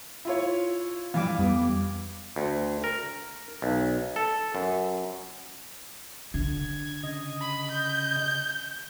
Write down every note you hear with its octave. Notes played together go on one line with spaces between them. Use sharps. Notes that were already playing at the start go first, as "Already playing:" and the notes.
E4 F4 C#5
G2 E3 F5 D6
F2 G3 B3
D2
A#4
B1
A4
F#2
D3 G#6
C#3 D#5
B5
G6